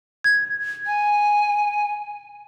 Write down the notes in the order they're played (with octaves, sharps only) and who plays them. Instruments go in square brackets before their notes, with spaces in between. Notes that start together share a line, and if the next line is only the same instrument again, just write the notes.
[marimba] G#6
[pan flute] G#5